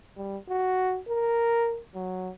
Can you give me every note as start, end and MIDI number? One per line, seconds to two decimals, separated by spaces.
0.17 0.37 55
0.50 0.99 66
1.09 1.81 70
1.95 2.30 54